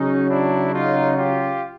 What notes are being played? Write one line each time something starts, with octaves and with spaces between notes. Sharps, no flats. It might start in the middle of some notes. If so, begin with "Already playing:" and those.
Already playing: C#3 F#3 C#4 D#4
D4 E4
D#4 F4
F4 G4